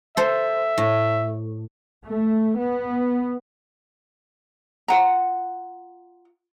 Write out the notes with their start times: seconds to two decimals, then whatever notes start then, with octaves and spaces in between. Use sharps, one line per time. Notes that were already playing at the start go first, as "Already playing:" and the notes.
0.17 A4 C5 E5
0.78 A2
2.05 A3
2.58 B3
4.88 F4 F#5 A#5